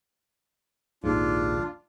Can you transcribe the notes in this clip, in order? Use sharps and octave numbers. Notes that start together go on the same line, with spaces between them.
A#1 D#2 G#2 D4 F4